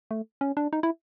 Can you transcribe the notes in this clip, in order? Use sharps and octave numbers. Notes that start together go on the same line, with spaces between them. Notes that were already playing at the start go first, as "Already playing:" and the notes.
A3
C#4
D4
D#4
E4